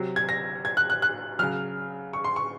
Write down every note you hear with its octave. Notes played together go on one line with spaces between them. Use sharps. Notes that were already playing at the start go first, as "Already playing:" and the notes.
Already playing: C3 F#3
G#6
A#6
G#6
F#6
F#6
F#6
C#3 F#3 F6
C#6
C6
C#6